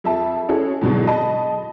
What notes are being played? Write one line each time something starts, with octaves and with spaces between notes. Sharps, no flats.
F2 E5 A5
C#4 E4 F#4 G#4 A4 C#5
E2 G#2 B2 D3 F#3
D#5 A5 B5